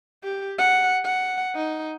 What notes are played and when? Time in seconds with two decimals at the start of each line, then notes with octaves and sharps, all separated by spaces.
0.24 G4
0.59 F#5
1.05 F#5
1.56 D#4